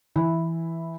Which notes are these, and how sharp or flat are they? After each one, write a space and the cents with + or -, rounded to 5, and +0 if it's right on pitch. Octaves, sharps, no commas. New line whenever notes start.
E3 +0 E4 +0